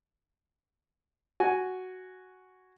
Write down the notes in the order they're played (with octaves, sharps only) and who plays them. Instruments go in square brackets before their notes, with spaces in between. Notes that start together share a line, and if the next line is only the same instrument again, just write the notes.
[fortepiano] F#4 G#5